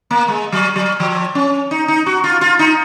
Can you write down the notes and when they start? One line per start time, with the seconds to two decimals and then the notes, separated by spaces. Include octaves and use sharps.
0.11 A#3
0.28 G#3
0.52 F#3
0.76 F#3
1.00 F3
1.35 C#4
1.71 D#4
1.88 D#4
2.06 F#4
2.24 F4
2.41 F4
2.59 D#4